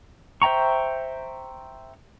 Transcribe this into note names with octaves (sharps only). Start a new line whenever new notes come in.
C5 E5 G5 A#5 C#6